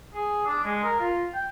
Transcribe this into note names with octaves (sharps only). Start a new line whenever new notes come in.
G#4
D4
G#3
A#4
F4
G5